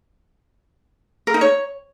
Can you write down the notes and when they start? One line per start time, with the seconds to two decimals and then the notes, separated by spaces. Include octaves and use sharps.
1.27 A#4
1.34 D#4
1.41 C#5